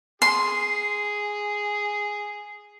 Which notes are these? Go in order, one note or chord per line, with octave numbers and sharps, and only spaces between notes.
G#4 C6